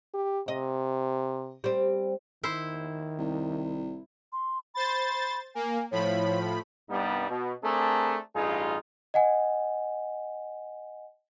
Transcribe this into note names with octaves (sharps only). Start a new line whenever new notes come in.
G4
C3 D#5
G3 C4
D#3 E4 C5
C2
C6
C5 B5 A6
A#3 G#5
A2 F3 C#5 B5
C2 G2 G3 B3 D#4
B2
A3 C4 D4 G#4 A#4
A1 G2 D#4 F4 G#4
D#5 F#5 G#5